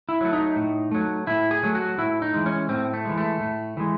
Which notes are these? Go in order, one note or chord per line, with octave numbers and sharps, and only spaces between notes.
E4
F#3 A3
D#4
A2
F#3 A3
A2 E4
G#4
F#3 A3
F#4
A2 E4
D#4
E3 G#3
C#4
A2 C4
A3
E3 G#3
A3
A2
E3 G#3